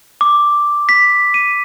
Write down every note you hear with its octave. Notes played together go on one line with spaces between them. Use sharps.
D6
B6
D#7